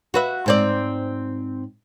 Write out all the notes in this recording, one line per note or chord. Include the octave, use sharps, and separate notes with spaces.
F#4 B4 E5
G#2 C4 D5